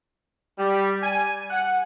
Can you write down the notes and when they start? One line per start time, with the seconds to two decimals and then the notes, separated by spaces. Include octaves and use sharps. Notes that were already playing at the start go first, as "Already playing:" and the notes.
0.59 G3
1.02 G#5
1.50 F#5